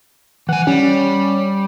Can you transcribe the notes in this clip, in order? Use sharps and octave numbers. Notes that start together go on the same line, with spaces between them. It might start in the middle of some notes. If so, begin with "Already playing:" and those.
E3 F#5 G#5
G3 C#4